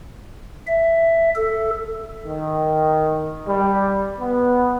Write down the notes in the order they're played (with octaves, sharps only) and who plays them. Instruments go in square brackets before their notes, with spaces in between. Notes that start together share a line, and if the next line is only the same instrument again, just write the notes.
[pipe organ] E5
A4
[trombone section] D#3
G3
B3